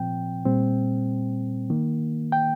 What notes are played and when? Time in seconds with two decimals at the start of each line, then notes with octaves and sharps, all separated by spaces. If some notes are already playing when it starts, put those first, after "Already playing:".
Already playing: A#2 F3 C4 G5
0.45 A#2 G3 C4
1.70 D#3 A#3
2.32 G5